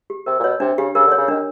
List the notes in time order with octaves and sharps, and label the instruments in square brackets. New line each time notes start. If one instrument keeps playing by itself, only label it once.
[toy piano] G4
[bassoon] C3 [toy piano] A#4
[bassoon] A#2
[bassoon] B2 [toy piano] C#5
[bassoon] C3 [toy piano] D4
[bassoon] C#3 [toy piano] G4
[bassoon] C#3 [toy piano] A#4
[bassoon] D3 [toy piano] C#5
[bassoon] C#3
[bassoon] D#3 [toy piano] D4